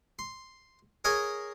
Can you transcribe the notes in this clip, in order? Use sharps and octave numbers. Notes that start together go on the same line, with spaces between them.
C6
G#4 A#4 C#5 D#5 G#5